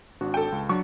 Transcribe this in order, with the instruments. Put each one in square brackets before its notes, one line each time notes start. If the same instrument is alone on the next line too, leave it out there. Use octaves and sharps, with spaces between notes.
[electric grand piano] G#1 D4 F#4
[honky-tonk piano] A4 G5
[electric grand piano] C#2
[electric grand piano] F#3 D4 [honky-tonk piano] C#6